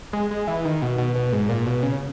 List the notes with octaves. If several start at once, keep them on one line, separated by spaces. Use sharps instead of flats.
G#3
G#3
E3
D#3
B2
B2
B2
G#2
A#2
B2
C#3